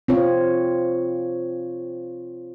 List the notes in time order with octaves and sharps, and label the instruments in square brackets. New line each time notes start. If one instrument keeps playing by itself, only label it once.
[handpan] C4 F4 C#5